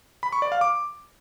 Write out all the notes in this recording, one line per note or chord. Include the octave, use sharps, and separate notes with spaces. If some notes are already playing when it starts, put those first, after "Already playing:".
B5
C#6
D5
F5
D6